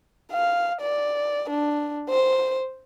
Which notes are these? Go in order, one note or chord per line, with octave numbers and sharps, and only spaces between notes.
F5
D5
D4
C5